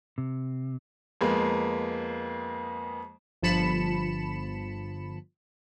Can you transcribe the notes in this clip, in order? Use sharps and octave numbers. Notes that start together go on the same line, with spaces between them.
C3
F2 G#3 A#3 B3
G1 F3 A5 B5 C#7 E7